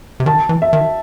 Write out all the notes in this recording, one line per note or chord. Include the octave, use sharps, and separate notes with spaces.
C3
D#3 A5
E3
E5
D#3